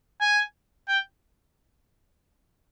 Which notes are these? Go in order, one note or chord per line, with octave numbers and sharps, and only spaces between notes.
G#5
G5